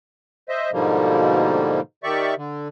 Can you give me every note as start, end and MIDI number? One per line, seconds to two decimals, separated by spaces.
0.49 0.71 72
0.49 0.71 75
0.49 0.71 76
0.72 1.81 44
0.72 1.81 47
0.72 1.81 50
0.72 1.81 53
0.72 1.81 55
0.72 1.81 58
2.04 2.34 51
2.04 2.34 67
2.04 2.34 74
2.04 2.34 76
2.04 2.34 85
2.37 2.68 50